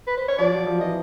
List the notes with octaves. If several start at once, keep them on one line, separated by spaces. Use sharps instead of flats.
B4
C5
C#5
F3 D5
F#3
F3
E3 D#5